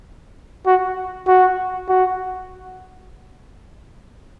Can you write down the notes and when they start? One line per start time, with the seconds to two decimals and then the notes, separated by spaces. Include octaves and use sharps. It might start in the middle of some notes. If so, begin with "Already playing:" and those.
0.66 F#4
1.28 F#4
1.88 F#4